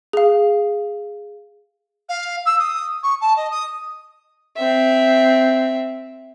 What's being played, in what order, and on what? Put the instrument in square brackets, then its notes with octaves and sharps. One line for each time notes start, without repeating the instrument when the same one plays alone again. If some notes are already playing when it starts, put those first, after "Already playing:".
[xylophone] G#4 F5
[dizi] F5
E6
D#6
C#6
A5
D#5
D#6
[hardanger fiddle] C4 E5